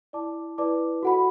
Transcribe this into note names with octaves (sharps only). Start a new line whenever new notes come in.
E4 D5 A5 D6
E4 B4 D5 A5 D6
F#4 A4 F#5 B5